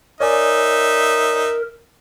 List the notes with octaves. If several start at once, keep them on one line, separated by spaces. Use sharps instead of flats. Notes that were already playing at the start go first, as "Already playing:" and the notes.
D#4 A#4 C#5 D5 E5 G#5